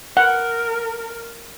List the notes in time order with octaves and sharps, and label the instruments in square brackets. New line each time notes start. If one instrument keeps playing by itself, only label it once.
[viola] A#4 [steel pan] F#5